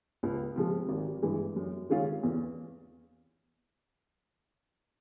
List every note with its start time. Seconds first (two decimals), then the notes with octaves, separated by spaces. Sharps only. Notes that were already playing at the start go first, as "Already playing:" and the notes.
0.23 C#2
0.56 C3 F3 G#3
0.89 G#1
1.22 G2 E3 G#3
1.56 F#2
1.89 D#3 G#3 C#4 F4
2.23 E2